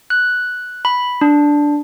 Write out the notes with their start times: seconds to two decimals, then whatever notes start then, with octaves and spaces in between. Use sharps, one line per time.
0.10 F#6
0.85 B5
1.21 D4